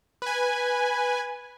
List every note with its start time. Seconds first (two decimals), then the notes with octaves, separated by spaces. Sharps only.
0.22 B4 G#5